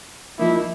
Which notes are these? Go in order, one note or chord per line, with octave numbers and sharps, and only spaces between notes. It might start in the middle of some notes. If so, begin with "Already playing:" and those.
F3 A#3 D#4 E4